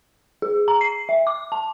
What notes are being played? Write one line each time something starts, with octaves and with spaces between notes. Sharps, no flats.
G#4
A#5
C7
E5
D6
A5